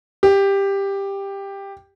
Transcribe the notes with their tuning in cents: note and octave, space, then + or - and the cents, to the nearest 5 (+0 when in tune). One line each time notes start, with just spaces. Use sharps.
G4 +10